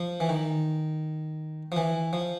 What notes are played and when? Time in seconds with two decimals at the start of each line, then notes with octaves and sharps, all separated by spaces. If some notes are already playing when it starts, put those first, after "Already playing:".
Already playing: F3
0.20 E3
0.29 D#3
1.72 F3
1.77 E3
2.13 F3